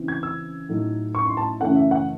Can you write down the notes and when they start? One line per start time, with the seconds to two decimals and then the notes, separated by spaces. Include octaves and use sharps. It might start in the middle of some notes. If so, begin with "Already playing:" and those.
Already playing: C#3 E3 C4
0.08 G#6
0.23 E6
0.69 A2 F#3 A3 D#4
1.15 C#6
1.26 C6
1.37 A5
1.60 F#2 C#3 E3 A3 C#4 F#5
1.75 E5
1.91 F#5